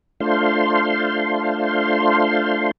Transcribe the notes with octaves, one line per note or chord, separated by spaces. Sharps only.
A3 D4 F4 C5 F5 C6